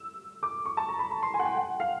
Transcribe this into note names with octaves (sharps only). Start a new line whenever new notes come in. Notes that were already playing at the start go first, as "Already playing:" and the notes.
Already playing: E6
D6
C#6
A5
A#5
B5
B5
C6
G#5
F#5
G5
F#5
F5